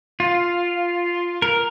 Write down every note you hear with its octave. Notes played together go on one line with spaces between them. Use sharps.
F4
A#4